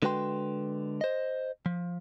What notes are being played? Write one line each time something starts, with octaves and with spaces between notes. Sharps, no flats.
D3 G#3 F#4 B4 G5 C6
C5 D#5
F3